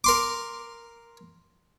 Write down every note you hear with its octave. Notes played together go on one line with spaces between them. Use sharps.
A#4 C6 D6